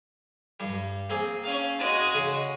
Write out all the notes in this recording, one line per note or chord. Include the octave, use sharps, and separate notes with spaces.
G2 G3
A#3 C4 G#4
C#4 F5
G#3 F#4
C#3